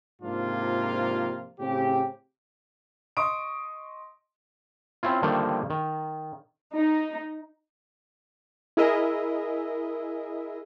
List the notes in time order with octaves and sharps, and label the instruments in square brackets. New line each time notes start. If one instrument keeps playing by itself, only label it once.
[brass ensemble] G#2 C3 F3 A#3 D4 F4
A2 C#3 C4 G4
[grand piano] D#5 C6 C#6 D#6 D7
[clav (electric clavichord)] C4 C#4 E4 F4
D3 D#3 F3 G3 A3 A#3
D#3
[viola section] D#4
[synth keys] E4 G#4 A#4 D#5 E5